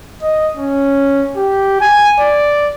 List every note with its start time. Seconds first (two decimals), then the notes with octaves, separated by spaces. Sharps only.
0.22 D#5
0.57 C#4
1.36 G4
1.81 G#5
2.19 D5